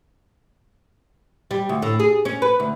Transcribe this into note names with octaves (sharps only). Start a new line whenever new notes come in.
G3
D2
A2
G#4
C#4
B4
D2